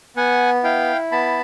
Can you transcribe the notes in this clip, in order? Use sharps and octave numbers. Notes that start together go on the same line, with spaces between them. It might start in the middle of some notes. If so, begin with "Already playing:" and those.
B3 F#5 G#5
E4 F5 G5
B3 A5 B5